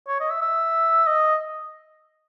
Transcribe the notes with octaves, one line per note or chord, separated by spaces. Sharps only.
C#5
D#5
E5
E5
D#5